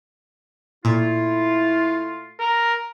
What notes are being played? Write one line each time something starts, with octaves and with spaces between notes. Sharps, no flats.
A#2 A3 E4 F4
A#4